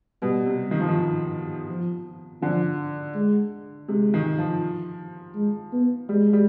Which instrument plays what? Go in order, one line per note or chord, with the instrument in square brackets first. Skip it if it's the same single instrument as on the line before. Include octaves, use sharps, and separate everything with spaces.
[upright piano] B2 [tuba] G3
[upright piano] C3
D#3
F3
D#3
[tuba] F3
[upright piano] D3 [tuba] F3
[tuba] G#3
[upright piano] C3 [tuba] G#3
[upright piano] D#3
F3
[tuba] G#3
B3
[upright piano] G3 [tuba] G#3
[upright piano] G3